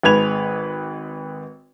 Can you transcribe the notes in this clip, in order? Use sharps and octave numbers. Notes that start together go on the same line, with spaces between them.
G#1 G#3 B4 G#6 F7